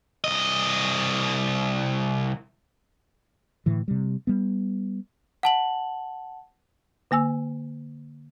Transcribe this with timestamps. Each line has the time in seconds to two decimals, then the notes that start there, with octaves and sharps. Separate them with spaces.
0.24 C2 D#5
3.66 A2 D3 E3
3.88 C3 G3
4.27 G3 B3
5.43 F#5 A5 F#7
7.11 D3 A#3 G#5 E6